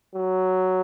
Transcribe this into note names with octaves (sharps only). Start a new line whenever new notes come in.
F#3